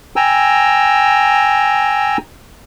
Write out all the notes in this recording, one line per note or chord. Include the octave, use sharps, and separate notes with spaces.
G5 G#5 A#5 E6